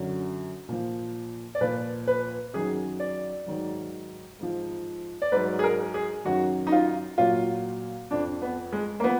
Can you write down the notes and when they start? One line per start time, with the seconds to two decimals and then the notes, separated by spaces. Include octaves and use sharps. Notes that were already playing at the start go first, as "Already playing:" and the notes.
Already playing: F#2 D3 F#3
0.69 A#2 F3
1.55 D5
1.61 A#2 F3 B4
2.07 B4
2.53 F#2 D#3 F#3 G#4
3.00 D5
3.46 G#2 D#3 F#3
4.40 G#2 F3
5.22 D5
5.32 G#2 B4
5.36 F#3
5.59 G#4
5.64 A#4
5.94 G#4
6.25 F#2 D#3 F#3 F#4
6.67 D#4
6.72 F4
7.18 A#2 F#3 F4
8.11 F2 F3 D4
8.42 B3
8.72 G#3
9.00 A#3
9.04 F3 B3